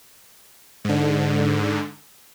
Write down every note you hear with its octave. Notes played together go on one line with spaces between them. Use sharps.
G#2 D3